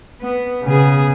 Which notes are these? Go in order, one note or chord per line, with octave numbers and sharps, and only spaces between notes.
B3
C#3 B3 G#4